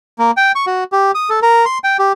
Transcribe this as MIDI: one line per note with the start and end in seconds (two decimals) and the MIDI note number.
0.19 0.31 58
0.37 0.52 79
0.55 0.65 85
0.67 0.84 66
0.92 1.11 67
1.15 1.30 87
1.30 1.40 69
1.42 1.65 70
1.66 1.78 84
1.84 1.97 79
1.99 2.12 67